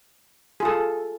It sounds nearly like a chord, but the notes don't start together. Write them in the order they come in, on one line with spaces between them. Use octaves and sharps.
G#4 F4 A4